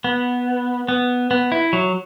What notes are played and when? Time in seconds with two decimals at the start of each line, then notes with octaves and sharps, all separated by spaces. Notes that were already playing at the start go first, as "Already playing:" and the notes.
0.04 B3
0.88 B3
1.31 B3
1.52 E4
1.73 F#3